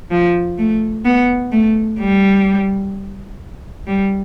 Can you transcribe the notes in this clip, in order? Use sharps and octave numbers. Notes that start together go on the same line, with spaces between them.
F3
A3
B3
A3
G3
G3